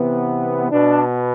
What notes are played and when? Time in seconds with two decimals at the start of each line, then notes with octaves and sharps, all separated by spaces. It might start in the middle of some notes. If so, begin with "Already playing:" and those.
Already playing: C3 E3 B3
0.71 B2 B3 D4